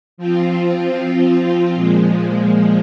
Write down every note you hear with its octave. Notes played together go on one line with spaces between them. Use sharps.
F3 C4 F4
A#2 F3 G#3